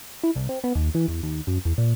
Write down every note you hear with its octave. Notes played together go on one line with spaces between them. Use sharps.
E4
C2
C4
B3
D#2
E3
E2
D#2
F#2
E2
A#2